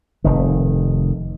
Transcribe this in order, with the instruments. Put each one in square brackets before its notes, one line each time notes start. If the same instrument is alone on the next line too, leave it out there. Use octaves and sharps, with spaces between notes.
[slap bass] F1 D#3